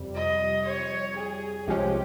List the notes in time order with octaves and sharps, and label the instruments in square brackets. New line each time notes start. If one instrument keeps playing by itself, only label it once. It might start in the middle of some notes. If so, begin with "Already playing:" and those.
Already playing: [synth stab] F2 C3 G3
[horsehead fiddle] D#5
C#5
G#4
[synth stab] C2 C3 F3 G#3 C#4 [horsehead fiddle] G4